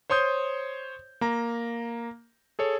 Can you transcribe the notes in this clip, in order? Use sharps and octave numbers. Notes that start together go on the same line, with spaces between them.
C5 C#5 C6 D#6 G6
A#3 A#5
G#4 A4 C#5